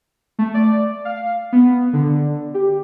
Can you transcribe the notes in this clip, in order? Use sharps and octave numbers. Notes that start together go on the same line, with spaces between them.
A3
D5
F5
B3
D3
G4